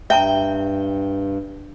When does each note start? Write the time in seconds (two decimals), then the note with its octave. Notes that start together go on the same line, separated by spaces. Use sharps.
0.10 G2 E5 G5 A5 A#5